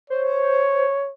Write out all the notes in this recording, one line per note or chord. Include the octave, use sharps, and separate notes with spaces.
C5 C#5